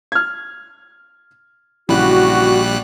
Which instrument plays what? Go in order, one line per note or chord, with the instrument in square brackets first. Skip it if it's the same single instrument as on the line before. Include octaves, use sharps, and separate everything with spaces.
[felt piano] F6 G#6
[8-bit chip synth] A#1 G3 F#6 [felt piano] C#3 E3 B5 [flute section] F#4